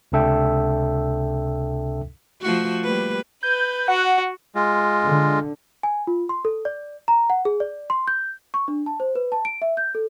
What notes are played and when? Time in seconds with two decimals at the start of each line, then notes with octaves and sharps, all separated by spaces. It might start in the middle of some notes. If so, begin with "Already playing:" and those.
0.12 C#2 C3 D4 A4 E5 G5
2.42 F3 A3 F#4
2.83 G3 A#3 B4
3.43 B4 G6
3.88 F#4 F#5
4.55 G#3 F4
5.05 D3
5.83 G#5
6.07 F4
6.29 C6
6.45 A4
6.65 D5
7.08 A#5
7.30 F#5
7.45 G#4
7.60 D5
7.90 C6
8.08 G6
8.54 C#6
8.68 D4
8.86 A5
9.00 C5
9.15 B4
9.32 A5
9.45 D7
9.62 E5
9.77 G6
9.95 A4